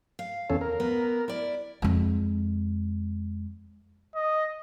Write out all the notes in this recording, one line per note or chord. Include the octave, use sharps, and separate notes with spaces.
F5
E2 C#4 A4
A#4
B3
E4 D5
F2 G#3
D#5